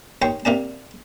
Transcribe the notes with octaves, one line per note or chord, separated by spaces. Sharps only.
D#2 C#5 G5 C6
C3 A#3 D4 A5